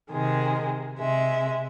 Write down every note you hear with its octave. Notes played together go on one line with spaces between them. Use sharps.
C3 D#3 G#3 G#4
C3 G#3 E5